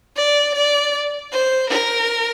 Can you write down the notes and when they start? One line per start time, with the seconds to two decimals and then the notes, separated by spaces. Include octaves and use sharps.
0.16 D5
0.55 D5
1.32 C5
1.70 A#4